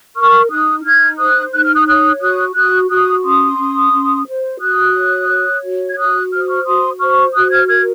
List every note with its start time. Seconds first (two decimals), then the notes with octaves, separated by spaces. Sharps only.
0.16 A#4 C#6 F6
0.50 D#4 D#6 F#6
0.84 D#4 F6 G#6
1.19 C5 D#6 F#6
1.53 D#4 F#6
1.64 F6
1.75 D#6 F#6
1.87 C#5 D#6 F#6
2.21 F#4 D#6 F#6
2.55 F#4 D#6 F#6
2.89 F#4 D#6 F#6
3.24 C#4 C6 D#6
3.58 C#4
3.93 C#4
4.27 C5
4.61 F#4 D#6 F#6
4.95 C#5
5.29 C#5
5.64 F#4
5.89 G#6
5.98 F#4 D#6 F#6
6.32 C5 F6
6.41 D#6
6.49 C#6 F6
6.66 F#4 C6 D#6
7.00 C5 C#6 F6
7.34 F#4 D#6 F#6
7.52 F6 G#6
7.68 A#4 F6 G#6